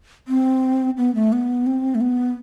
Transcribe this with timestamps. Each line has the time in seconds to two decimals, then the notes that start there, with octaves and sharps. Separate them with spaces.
0.28 C4
0.97 B3
1.15 A3
1.33 B3
1.67 C4
1.95 A3
2.01 B3